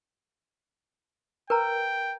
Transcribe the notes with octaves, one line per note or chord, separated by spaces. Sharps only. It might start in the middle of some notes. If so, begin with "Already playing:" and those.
A#4 B4 G5 A#5